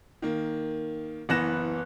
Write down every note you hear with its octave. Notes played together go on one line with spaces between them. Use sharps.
D#3 A#3
F#1 E3 B3 F#6 A#6 E7